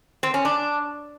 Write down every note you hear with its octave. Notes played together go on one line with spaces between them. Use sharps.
C4
C#4
D4